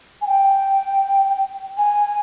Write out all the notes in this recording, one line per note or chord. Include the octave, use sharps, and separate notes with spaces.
G#5
G5
G#5